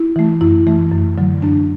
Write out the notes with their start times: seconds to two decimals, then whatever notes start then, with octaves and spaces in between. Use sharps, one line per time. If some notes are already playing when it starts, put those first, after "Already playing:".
Already playing: E4
0.16 E3 A3
0.41 F#2 E4
0.67 E3 A3
0.92 F#2
1.18 D3 F#3
1.42 F#2 D4